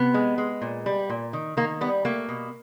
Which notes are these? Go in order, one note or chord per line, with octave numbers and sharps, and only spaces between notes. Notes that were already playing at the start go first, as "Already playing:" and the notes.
Already playing: C3 B3
G#3
G#3
A#2
G3
A#2
D#3
D#3 A#3
G3 B3
A3 A#3
B2